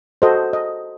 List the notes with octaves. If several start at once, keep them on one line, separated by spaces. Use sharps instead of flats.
F#4 A4 C5 D#5
D#5